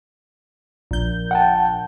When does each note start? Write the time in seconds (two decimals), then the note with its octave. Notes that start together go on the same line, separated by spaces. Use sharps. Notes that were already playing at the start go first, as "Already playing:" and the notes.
0.91 A#1 G6
1.31 F#5 G5 A5